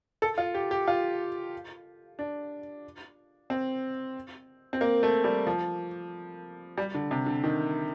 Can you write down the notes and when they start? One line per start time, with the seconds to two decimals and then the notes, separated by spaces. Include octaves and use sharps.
0.22 A4
0.38 F4
0.55 G4
0.71 G4
0.87 F4
2.19 D4
3.50 C4
4.73 C4
4.81 A#3
5.03 A3
5.24 G3
5.47 F3
6.78 G3
6.94 D3
7.11 C3
7.26 D3
7.44 D#3